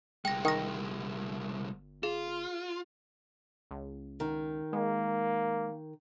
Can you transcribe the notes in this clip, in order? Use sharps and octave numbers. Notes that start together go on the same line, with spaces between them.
G1 C2 G#3 G5 A#6
D#3 G5 A#6
F4 G#4
C#2
D#3
G#3 A#3